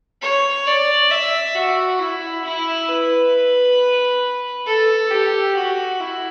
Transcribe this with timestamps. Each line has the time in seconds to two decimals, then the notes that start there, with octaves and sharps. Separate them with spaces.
0.22 C#5
0.67 D5
1.11 E5
1.55 F#4
1.99 E4
2.44 E4
2.89 B4
4.66 A4
5.10 G4
5.55 F#4
6.00 E4